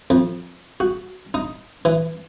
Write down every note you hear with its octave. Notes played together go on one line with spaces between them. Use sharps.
F2
F#4
D#4
E3